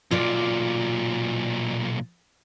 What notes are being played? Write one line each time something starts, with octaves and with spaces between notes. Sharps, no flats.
B1 A#2 F4 D5